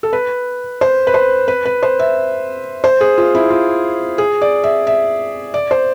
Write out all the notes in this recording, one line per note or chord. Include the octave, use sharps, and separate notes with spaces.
A4
B4
C5
B4
C5
B4
B4
C5
E5
C5
G#4
F4
E4
F4
G#4
D5
E5
E5
D5
C5